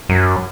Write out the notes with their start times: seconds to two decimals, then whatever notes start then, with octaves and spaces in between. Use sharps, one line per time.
0.09 F#2